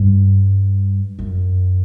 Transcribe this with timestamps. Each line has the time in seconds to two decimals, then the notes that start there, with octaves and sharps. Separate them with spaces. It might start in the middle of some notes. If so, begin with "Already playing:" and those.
Already playing: G2
1.19 F#2